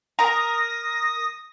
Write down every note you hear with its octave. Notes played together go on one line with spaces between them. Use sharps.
A#4 A#5 D#6 A#6